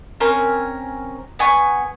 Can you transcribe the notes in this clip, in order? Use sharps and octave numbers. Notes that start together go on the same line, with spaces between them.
C4 C#4 A#4 G#5
B3 G#5 C#6